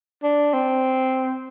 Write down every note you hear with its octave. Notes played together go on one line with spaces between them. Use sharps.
D4
C4